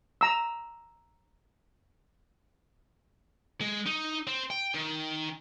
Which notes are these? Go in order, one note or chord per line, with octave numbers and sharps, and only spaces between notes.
A#5 E6
G#3
D#4
C4
G5
D#3